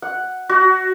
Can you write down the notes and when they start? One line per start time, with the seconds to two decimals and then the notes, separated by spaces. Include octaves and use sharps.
0.02 F#5
0.49 F#4